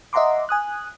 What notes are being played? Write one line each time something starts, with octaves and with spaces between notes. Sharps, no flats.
D#5 E5 F#5 A#5 C6 D6
G#5 D#6 F#6